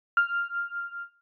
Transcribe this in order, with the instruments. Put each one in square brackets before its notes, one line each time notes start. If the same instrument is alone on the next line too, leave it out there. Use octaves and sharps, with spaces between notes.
[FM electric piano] F6